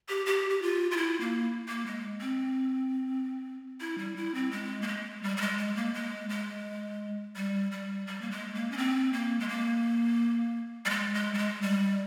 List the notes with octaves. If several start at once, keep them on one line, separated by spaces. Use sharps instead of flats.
G4
G4
G4
F4
F4
E4
A#3
A#3
G#3
C4
E4
G3
E4
C4
G#3
A#3
G#3
G3
G3
G#3
G#3
A#3
G#3
G#3
G3
G3
G3
A#3
G#3
A#3
C#4
C4
A#3
G#3
A#3
G3
G#3
G#3
G3
G#3
G3